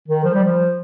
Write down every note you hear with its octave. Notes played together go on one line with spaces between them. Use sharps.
D#3
F3
G3
F3